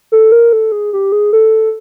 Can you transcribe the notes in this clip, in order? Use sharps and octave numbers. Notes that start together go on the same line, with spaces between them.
A4
A#4
A4
G#4
G4
G#4
A4